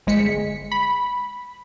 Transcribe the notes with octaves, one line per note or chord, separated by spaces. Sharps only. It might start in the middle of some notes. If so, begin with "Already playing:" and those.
G1 G#3 B6 C#7
B5